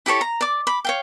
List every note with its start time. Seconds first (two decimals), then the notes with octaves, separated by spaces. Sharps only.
0.06 E4 G4 A4 C#5
0.21 A#5
0.41 D5 D6
0.67 B5 D6
0.85 C#5 F5 G5